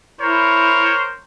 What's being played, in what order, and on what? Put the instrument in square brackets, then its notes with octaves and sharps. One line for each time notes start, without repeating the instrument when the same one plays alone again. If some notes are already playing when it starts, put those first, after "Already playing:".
[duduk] E4 [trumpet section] A#4 C5 C#5